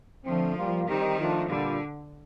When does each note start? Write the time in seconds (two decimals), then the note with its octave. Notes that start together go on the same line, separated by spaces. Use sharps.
0.25 D3 F3 A3 C4
0.56 G3 A#3 F4
0.87 D#3 G3 C4 D#4 G4
1.18 F3 A3 D4 F4
1.48 A#2 D3 G3 D4 F4